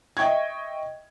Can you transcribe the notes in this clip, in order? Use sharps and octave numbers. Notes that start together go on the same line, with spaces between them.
D#5 E5 G5 C#6 G#6